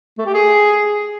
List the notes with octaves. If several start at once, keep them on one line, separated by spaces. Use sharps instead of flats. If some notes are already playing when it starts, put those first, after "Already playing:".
A3
G4
G#4